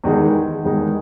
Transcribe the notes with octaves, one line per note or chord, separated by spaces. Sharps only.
E2 D#3 G#3 D#4 G#4
E2 D#3 G#3 D#4 G#4